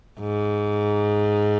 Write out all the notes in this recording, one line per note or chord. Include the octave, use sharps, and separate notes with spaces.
G#2